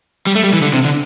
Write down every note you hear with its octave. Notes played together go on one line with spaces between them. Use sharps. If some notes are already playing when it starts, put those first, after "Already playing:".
G3
A3
G3
E3
D3
C3
D3